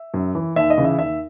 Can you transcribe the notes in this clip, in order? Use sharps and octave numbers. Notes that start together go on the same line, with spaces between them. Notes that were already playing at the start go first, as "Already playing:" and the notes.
Already playing: E5
F#2
E3
D#2 E5
D#5
C#3 E3
E5
D#2 E5